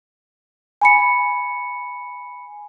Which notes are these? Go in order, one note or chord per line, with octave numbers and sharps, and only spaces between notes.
G#5 B5 C#7